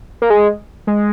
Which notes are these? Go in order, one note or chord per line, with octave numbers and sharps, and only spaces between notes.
A#3
G#3
G#3